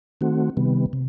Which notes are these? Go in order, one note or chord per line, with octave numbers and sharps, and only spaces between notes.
D#3 A3 C4 F#4
C3 D#3 G3 B3
C3